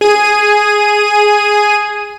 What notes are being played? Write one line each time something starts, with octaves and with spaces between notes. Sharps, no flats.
G#4 D#7